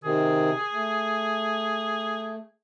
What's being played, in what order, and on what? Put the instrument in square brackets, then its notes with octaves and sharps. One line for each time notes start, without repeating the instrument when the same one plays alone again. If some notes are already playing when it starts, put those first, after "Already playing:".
[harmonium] C3 D#3 [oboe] G#4
[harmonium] A3